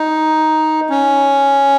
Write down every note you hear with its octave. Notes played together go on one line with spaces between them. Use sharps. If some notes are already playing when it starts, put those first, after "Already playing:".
Already playing: D#4
C#4